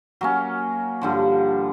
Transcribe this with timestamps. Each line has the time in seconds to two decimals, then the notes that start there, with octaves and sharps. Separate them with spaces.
0.21 F#3 A#3 C#4
1.01 G2 D3 F3